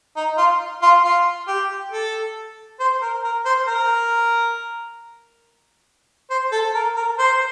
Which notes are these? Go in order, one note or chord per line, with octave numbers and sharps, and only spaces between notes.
D#4
F4
F4
F4
G4
A4
C5
A#4
A#4
C5
A#4
C5
A4
A#4
A#4
C5